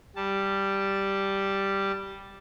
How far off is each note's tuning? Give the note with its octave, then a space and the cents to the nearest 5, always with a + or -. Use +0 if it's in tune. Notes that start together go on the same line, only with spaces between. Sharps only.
G3 +0 A5 +0